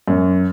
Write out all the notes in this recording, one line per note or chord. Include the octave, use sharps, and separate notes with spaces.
F#2